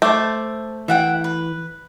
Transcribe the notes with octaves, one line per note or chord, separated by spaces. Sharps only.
A3 C5 A5 D6
E3 E5 F#5 G5
B4